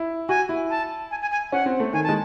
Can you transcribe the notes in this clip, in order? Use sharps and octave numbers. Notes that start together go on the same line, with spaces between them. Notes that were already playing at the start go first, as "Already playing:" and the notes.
Already playing: E4
F#4 G#5
E4
A5
G#5
G#5
G#5
C#4 F#5
C4
A3
D#3 G#5
A5
G#3